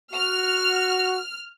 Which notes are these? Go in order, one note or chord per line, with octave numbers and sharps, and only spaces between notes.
F#4 F6